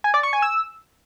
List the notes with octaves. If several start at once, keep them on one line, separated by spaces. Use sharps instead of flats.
G#5
D5
C#6
G#5
E6